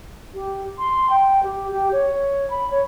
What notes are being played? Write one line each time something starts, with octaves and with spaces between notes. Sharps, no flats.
G4
C6
G5
G4
G4
C#5
B5
C#5